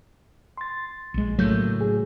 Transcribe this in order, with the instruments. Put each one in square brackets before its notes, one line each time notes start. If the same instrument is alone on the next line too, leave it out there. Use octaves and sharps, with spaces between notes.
[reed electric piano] C6 A6
[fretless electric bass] A#1 G#3
[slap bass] A2 F#3 [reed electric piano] C#3 A#3 G6 [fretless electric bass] A3
[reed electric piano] G#4